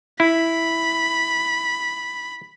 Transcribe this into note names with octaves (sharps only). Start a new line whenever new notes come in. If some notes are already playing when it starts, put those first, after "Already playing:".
E4 B5